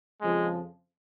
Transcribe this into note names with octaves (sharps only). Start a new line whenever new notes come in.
F2 C#3 F3 G#3